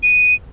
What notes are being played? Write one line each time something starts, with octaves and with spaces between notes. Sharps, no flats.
D#7